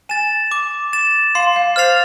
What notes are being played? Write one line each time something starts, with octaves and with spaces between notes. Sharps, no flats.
G#5 A6 E7
D6
A6 E7
F5 C6
F5
C5 F6 A6 C7 F7